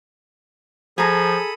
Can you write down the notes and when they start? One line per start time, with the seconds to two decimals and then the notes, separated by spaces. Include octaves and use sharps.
0.98 F3 G#4 A4 A#5 B5 D#6